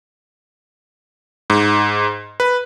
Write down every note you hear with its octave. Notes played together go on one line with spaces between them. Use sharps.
G#2
B4